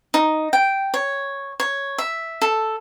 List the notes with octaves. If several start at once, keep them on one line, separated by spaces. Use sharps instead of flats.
D#4
G5
C#5
C#5
E5
A4